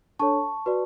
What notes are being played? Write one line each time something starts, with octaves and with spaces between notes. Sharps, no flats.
D4 A4 C#5 A5 C#6
F#4 B4 D5